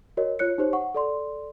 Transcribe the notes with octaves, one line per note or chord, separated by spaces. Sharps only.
F#4 A#4 C#5 D#5
F4 C#5 F#6 C#7
D#4 G4 C5 C#5
F#5 C#6
A4 D5 C6